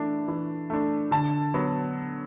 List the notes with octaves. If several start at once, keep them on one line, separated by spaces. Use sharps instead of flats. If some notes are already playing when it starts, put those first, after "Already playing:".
Already playing: E3 A3 D4
E3
A3 D4
D3 A5
F#3 B3